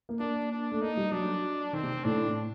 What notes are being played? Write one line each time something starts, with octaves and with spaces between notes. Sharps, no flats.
A#3
A#3 D4
D4
A3
A#3 D#4
G3
F#3 D4
D#3 C4
C3
A2 D4